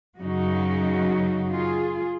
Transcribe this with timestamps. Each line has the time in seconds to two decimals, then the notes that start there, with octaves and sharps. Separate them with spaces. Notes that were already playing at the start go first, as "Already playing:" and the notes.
0.19 F#2 C#3 F#3 D#4 F#4
1.55 F4 G#4